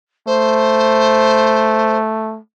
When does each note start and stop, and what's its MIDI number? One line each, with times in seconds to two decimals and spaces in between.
0.27 2.39 57
0.27 1.97 72